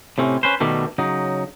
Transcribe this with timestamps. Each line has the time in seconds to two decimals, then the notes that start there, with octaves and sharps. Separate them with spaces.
0.18 A2 C3 C4 C#4
0.43 C#4 B4 C5
0.60 B2 D#3 G3 A3
0.98 C#3 F#3 D#4